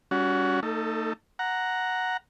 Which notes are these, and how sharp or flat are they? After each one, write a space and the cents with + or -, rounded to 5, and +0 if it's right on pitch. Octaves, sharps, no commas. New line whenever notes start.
G3 +0 C#4 +30 F#4 +0
A3 +40 D#4 +0 A4 +0
F#5 +0 A#5 +0